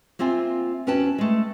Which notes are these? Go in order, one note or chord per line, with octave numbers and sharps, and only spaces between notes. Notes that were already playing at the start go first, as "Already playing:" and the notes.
A#3 C4 F4 E5 G#5
E2 C#4 F#4 B4 G5 A5
G#3 A3